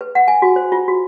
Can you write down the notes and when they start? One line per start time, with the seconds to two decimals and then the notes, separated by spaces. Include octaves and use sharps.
0.01 B4
0.15 F#5
0.28 G#5
0.42 F#4
0.56 C5
0.72 F4
0.88 F#4